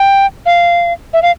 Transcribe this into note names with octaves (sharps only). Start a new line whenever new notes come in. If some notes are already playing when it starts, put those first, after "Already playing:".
Already playing: G5
F5
E5
F5